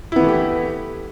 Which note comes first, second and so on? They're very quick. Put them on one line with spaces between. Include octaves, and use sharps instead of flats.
E4 B3 E3 A3 G4